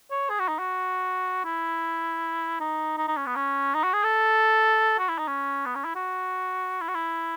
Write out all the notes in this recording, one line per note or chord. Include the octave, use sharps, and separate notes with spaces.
C#5
G#4
F#4
D#4
F#4
E4
D#4
D#4
D#4
C#4
B3
C#4
D#4
F#4
G#4
A4
F#4
E4
D#4
C#4
B3
C#4
E4
F#4
E4
F#4
E4